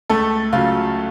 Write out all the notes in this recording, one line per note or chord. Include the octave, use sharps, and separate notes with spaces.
C#2 A3 A4
C#3 F#3 F4